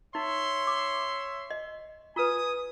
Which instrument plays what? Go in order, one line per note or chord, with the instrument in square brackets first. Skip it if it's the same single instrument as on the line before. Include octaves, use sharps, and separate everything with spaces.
[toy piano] D#4 [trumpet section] C#5 E5 C6
[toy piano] D6
D#5
[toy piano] F4 B4 [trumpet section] G#5 D#6